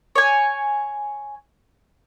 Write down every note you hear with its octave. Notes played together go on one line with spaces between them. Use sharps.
C#5 G#5